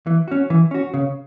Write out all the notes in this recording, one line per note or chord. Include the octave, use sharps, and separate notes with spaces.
E3
C#4 F#4
E3
C#4 F#4
C#3